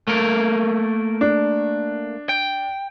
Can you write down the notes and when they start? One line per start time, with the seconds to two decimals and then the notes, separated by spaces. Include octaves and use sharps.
0.07 A3 A#3 A#4
1.21 D4
2.29 G5